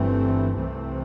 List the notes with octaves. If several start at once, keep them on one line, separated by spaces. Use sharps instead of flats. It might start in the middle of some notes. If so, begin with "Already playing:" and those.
Already playing: G1 G2 E3 A3 C4
C2 C3 E3 A3 C4